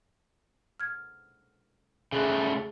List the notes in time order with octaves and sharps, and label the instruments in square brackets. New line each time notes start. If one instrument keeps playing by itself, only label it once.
[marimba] F6 G#6
[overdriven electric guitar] C#3 A3 [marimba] G#4 F#6